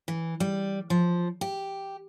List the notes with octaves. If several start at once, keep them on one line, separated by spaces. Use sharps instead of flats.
E3
G3
F3
G4